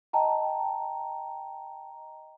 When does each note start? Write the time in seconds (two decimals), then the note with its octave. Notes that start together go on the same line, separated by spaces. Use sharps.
0.13 D#5 G5 A5 A#5